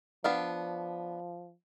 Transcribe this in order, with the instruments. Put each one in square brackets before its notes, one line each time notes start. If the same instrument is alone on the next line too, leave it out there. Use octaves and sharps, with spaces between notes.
[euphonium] F3 [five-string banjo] B3 D4 F5